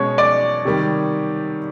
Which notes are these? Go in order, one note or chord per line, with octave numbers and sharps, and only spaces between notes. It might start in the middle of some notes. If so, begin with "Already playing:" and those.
Already playing: B2 G#3 C#4 C#5
D5
C3 D#3 G3